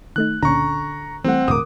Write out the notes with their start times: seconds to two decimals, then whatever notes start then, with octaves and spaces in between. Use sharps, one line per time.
0.16 D#3 A3 D#4 F#6
0.43 C#2 A#2 D3 C#4 A#5 C#6
1.24 E3 G3 A3 C4 F#5
1.48 E1 A2 D3 A#4 D6 D#6